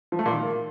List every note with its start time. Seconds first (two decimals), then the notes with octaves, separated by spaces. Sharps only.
0.12 F3
0.19 A3
0.26 A#2
0.32 D#3